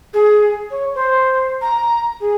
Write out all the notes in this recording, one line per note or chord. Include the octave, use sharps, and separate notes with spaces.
G#4
C#5
C5
A#5
G#4